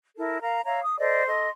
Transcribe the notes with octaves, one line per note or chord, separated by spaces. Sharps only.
E4 A4 A#4
A#4 F5 A#5
C#5 E5 F5 A#5
D#6
A4 C5 D5 D#5
A4 D#5 C6